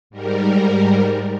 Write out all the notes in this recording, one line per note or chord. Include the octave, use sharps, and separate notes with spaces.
G#2 G3 A#4